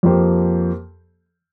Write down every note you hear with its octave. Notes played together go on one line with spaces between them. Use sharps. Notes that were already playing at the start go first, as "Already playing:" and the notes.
F2 F3 A#3 G4 C5